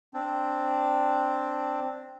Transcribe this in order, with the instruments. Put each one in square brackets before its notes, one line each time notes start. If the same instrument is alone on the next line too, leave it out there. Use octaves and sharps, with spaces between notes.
[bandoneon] C4 D4